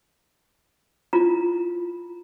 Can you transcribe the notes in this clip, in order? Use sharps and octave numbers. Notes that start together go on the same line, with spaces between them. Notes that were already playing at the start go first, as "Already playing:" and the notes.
E4 F4 A#5